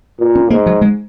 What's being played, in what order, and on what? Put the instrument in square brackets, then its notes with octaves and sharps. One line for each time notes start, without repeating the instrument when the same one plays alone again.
[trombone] A#2
[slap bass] C#4
[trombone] G#2 [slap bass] A#3
[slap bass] F#3
G#3